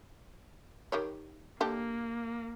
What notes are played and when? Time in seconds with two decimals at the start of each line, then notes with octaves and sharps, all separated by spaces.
0.92 D#3 G4 C#5
1.60 A#3 D4 G4 A4